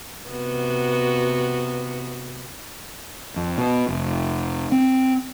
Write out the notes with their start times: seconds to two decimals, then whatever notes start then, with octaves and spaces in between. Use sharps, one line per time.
0.27 C3 B3 F#4
3.36 F2
3.58 B2
3.88 F1
4.72 C4